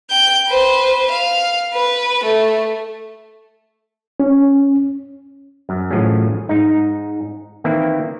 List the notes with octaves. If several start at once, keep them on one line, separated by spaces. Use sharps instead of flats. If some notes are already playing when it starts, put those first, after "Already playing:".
G5 G6
B4 C5
F5
B4
A3
C#4
F#2
A1 F#2 A2 F3 C#4 G#4
G#2 D#4
D#3 E3 A#3 C4 E4